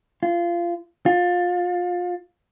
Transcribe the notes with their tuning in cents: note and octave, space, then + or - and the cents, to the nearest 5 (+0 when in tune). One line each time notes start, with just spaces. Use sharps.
F4 -20
F4 +25